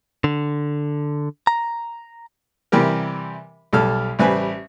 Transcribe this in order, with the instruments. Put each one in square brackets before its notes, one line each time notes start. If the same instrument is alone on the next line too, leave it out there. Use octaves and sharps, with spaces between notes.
[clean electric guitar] D3
A#5
[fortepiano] C3 E3 G3 G4 A#4
B1 G3 A4 F6
A1 G3 B4 C5 G#5